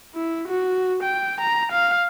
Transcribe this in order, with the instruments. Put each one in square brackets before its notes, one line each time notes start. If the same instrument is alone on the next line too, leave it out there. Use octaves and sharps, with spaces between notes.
[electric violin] E4
F#4
G5
A#5
F5